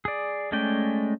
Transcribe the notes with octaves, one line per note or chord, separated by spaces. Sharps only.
G#4 D5
G#3 A3 C#4 D5 G5